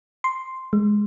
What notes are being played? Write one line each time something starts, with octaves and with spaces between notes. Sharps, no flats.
C6
G#3